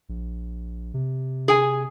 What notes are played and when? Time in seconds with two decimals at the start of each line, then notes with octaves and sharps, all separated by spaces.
0.09 A#1
0.94 C3
1.48 G#4 G#5